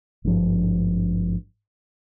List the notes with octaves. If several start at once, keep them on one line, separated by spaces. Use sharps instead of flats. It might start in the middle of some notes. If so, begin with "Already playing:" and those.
G#1 G2 F3